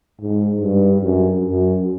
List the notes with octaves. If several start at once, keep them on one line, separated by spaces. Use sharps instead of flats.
G#2
G2
F#2
F#2